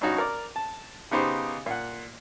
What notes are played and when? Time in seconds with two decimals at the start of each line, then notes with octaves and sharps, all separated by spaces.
0.01 G2 C#4 D#4 F#4
0.18 A#4 D5
0.56 A5
1.11 C#3 B3 D#4 G4 C5
1.66 A#2 F#5